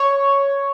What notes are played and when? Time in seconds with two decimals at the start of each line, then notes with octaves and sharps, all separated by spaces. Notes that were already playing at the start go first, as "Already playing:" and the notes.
Already playing: C#5